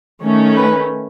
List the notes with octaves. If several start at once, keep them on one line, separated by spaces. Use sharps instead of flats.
D#3 A3 C#4
B4